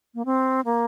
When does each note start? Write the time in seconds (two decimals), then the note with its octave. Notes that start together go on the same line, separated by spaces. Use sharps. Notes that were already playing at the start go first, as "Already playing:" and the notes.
0.15 A#3
0.25 C4
0.65 A#3